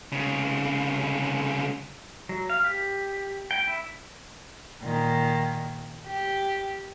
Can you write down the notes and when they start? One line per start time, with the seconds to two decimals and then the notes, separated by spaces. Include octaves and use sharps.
0.12 C2 C#3
2.29 F#3
2.50 F5
2.64 G4
3.51 G5
3.68 E4
4.83 A#2 D#3
6.06 G4